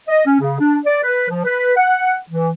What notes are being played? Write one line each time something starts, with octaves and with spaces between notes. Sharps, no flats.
D#5
C#4
C#3
D4
D5
B4
F3
B4
F#5
E3